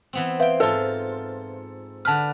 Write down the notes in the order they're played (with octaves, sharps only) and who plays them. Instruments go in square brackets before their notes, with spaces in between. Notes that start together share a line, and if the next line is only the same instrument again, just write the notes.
[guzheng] E3 B3 C4
[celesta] B4 E5 F5 [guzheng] C5 G5
[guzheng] G#2 F4 [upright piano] A4
[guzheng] D3 B4 [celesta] A5 F6